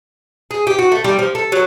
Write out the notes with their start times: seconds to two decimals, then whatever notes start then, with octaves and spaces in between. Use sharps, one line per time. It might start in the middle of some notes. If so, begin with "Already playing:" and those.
0.51 G#4
0.67 G4
0.79 F#4
0.92 A3
1.04 G3
1.19 F3
1.35 A4
1.52 F#3